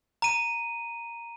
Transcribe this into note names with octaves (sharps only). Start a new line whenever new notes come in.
A#5 D#7